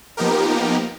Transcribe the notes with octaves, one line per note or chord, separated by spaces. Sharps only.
F3 A#3 B3 D#4 G4 A#4